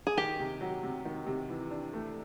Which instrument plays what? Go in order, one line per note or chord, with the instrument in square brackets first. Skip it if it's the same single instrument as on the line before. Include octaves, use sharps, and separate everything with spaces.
[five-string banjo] G#4
[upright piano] D#3 [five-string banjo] G4
[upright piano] C3
F#3
C3
D#3
C3
E3
D4
A3